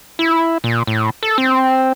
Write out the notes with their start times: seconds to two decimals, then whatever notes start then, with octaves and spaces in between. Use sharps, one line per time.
0.19 E4
0.64 A#2
0.87 A2
1.23 A4
1.38 C4